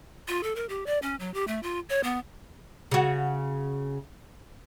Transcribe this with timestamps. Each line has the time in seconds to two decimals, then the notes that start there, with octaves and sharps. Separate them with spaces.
0.28 F4
0.43 A4
0.56 A#4
0.69 G4
0.86 D5
1.02 C#4
1.20 F#3
1.34 G4
1.48 A3
1.63 F4
1.89 C#5
2.03 B3
2.91 C#3 F#4